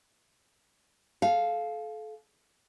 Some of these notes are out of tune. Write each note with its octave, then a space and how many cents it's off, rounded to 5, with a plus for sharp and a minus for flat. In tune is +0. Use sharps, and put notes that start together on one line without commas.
A4 -30 F5 +0